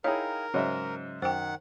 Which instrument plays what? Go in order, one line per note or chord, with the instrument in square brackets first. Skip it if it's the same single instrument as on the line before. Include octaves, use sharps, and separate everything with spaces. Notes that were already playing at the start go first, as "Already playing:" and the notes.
[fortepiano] D#4 E4 G#4 [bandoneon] A#4 [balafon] C#5 [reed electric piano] F5 G5
[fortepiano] G#2 D#5 E5 [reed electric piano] C#3 F#3 C#4
[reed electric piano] F#2 [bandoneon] D#3 F#5 [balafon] C5 G5